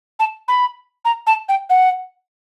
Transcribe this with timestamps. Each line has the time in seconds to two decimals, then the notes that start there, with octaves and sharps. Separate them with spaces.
0.19 A5
0.48 B5
1.05 A#5
1.27 A5
1.49 G5
1.70 F#5